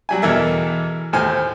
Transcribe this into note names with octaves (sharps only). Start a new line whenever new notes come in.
F#3 G3 G#5
E2 B2 E3 A4 A#4 E5
D#2 A2 C5 G#5 F6